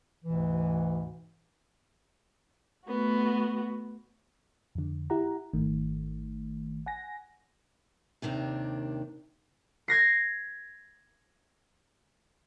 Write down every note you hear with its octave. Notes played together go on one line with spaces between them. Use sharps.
D2 G#2 B2 E3
A3 B3 F#4
F2 D3
E4 G4 F#5 A#5
G#1 D#3 A3
F#5 G#5 A#6
D#2 C3 D#3 D4
G#6 A#6 C7